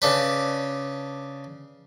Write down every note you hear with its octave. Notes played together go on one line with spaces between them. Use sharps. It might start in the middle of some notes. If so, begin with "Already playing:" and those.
C#3 D4 B4